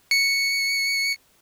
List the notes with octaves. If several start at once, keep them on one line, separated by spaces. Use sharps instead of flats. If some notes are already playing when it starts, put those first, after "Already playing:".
C#7